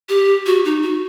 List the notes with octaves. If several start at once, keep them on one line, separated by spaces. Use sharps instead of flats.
G4
F#4
D#4
F#4